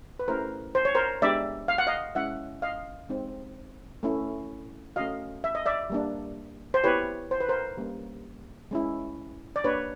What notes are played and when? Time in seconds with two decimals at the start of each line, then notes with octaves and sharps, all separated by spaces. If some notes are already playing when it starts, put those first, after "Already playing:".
0.19 B4
0.28 A3 C#4 E4 G4 A#4 C5
0.75 C5
0.85 C#5
0.95 A#4 C5
1.22 G#3 B3 D4 G4 D5 E5
1.68 F5
1.78 F#5
1.87 D#5 F5
2.15 G#3 C#4 E4 E5 F#5
2.62 D#5 F5
3.09 G#3 C4 D#4
4.03 A3 C#4 E4
4.96 A3 C#4 F#4 D#5 F5
5.44 E5
5.55 D#5
5.66 D5 E5
5.90 G3 A#3 D4
6.74 C5
6.84 B3 E4 G4 B4 C#5
7.31 C5
7.40 B4
7.49 A#4 C5
7.77 G3 A#3 C#4
8.71 G#3 C#4 E4
9.56 D5
9.64 A#3 D4 G4 B4 C#5